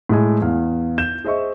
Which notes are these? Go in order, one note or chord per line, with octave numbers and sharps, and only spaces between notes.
A2 G#3 G#5
E2 F5
G6 E7
G#4 C5 D#5 E5 C#6